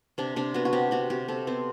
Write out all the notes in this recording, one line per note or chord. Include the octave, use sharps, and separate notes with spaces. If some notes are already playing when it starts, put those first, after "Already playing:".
C3 D4
C3 D4
B3 F#4
F#4
C3 G4
C3 F#4
C3 G4
C3 A4
B3 C4